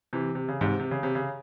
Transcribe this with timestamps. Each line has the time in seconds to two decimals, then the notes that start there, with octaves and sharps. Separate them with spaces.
0.13 C3 E3
0.35 C3
0.49 C#3
0.61 G#2 C3
0.79 C3
0.91 C#3
1.03 C3
1.15 C#3